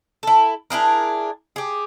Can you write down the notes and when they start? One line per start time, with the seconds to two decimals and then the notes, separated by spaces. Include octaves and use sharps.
0.23 E4 A4
0.70 D4 E4 G#4 A#4
1.56 G4 G#4